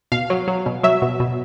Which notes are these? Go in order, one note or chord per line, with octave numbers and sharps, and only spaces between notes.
B2 F5
F#3
F#3
B2
F#3 E5
B2
B2